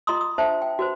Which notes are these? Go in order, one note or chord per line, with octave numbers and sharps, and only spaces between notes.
F4 D#5 A#5 C6 D#6
D#6
D4 C5 E5 A5
G5
F#4 B4 C5